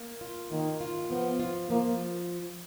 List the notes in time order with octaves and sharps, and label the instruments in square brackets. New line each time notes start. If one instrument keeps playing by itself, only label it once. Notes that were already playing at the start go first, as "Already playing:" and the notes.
Already playing: [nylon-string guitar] A#3
F4
[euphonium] D#3 [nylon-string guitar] A#3
[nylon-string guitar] F4
[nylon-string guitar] F3 [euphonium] B3
[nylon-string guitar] F4
[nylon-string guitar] F3 [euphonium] A#3